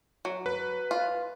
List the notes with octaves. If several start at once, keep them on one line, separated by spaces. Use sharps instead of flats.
F#3
B4
F4